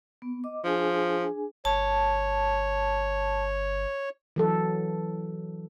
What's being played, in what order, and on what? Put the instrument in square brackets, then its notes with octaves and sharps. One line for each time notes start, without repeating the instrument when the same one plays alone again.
[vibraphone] B3
D#5 D6
[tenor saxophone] F3 [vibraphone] D4 G#4 G#5
[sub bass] G1 [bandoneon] C#5 [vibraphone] A5
[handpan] E3 F#3 A4